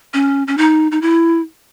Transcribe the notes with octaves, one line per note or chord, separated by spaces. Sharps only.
C#4
C#4
D#4
D#4
E4